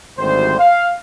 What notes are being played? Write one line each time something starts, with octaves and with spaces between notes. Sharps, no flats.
G#1 D2 D#3 G3 C5
F5